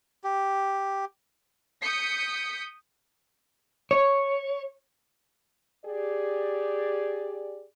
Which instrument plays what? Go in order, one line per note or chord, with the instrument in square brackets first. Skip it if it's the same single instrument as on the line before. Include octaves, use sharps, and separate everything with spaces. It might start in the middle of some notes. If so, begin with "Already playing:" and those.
[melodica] G4
[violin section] D#6 G6 B6 C#7
[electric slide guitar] C#5
[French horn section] G4 G#4 D5